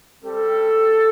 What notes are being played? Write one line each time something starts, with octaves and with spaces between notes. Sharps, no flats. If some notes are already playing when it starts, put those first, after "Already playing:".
G3 C4 G4 A4